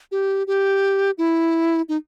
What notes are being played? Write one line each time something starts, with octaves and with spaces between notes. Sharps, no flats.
G4
G4
E4
D#4